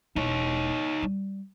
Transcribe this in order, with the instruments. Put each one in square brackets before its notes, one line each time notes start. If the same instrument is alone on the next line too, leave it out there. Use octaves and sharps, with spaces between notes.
[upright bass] E1 E4 [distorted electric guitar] D#4 C#5
[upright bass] G3